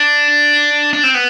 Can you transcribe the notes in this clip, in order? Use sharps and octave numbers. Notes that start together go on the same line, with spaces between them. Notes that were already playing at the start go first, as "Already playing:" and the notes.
Already playing: D4
D4
C4
B3